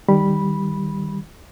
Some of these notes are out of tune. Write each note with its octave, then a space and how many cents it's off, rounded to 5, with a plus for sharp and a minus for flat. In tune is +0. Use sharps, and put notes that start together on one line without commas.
D#3 +0 G3 +0 B5 -10